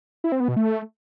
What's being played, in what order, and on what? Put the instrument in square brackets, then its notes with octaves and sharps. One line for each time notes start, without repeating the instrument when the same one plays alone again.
[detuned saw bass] E4
C4
B3
B2
A3